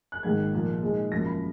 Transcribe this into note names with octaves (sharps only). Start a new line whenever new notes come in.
F#6
G#1 G#2 D#3 A#3 G#6
A#2 F3 A#3
A#2 G#3 D#4
G#1 F#2 F3 A#3 A#6
B5